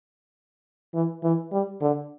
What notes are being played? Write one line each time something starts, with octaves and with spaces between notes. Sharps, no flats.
E3
E3
G3
D3